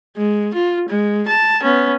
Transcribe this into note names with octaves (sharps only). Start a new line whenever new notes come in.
G#3
F4
G#3
A5
B3 C#4